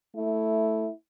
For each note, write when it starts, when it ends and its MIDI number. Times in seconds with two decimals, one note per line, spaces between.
0.16 0.88 57
0.16 0.92 64